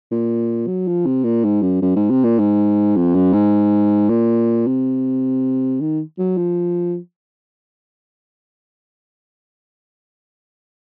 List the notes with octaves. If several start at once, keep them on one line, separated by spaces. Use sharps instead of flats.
A#2
F#3
F3
C3
A#2
G#2
F#2
F#2
G#2
C3
A#2
G#2
F2
F#2
G#2
A#2
C3
D#3
F#3
F3